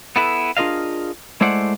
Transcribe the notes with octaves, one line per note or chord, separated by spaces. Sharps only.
B3 E4 A4 B4
D4 F4 G#4 A#4 D#5 F5
G#3 A3 E4 C5 D5 F#5